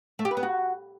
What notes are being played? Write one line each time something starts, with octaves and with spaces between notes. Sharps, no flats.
A3
G4
B4
B3
F#4